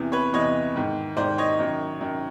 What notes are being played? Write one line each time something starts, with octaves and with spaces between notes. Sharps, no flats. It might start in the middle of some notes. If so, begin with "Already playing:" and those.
Already playing: E2 C3 E3
B4 C#5
E2 C3 E3 C#5 D#5
G#2 D#3
G#2 D#3 C5 D5
C#5 D#5
F#2 D#3
F#2 D#3